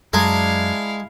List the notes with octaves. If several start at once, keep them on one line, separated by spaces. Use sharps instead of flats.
F#2 G#3 E4 D5 F5 A5 A#5